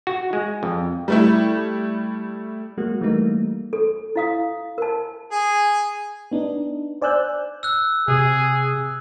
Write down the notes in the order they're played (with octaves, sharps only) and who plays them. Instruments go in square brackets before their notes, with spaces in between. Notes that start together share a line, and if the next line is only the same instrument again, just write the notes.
[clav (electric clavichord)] F#4
G#3
F2
[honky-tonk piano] G3 A3 E4
[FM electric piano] F#3 G#3 A#3 F#4
E3 G3 A3 A#3 D#4
[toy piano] A4
E4 F5 D#6
A#4 A5
[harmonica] G#4
[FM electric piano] B3 D4 D#4
C5 D5 G#5 E6 F#6 G6
[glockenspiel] E6 F#6
[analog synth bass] C3 [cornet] G#4